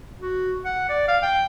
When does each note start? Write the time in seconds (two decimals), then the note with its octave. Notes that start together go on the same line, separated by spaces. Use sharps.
0.21 F#4
0.65 F#5
0.89 D5
1.08 F5
1.22 G5